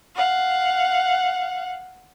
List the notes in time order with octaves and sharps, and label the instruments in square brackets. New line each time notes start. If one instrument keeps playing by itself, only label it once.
[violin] F5 F#5